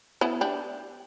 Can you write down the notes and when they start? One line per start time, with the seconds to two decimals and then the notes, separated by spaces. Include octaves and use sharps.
0.21 B3 E4
0.41 D4 G4